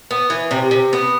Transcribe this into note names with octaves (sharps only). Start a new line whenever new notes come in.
B3
E3
C3
C3
B3